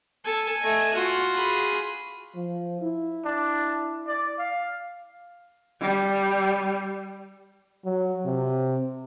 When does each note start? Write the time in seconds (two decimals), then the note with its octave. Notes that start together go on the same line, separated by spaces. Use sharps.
0.25 A4 G#5
0.61 A3 D#5
0.94 F4 F#4 F#5
1.35 G#4 B5
2.35 F3
2.82 E4
3.25 D4
4.07 D5
4.38 F5
5.82 G3
7.85 F#3
8.25 C3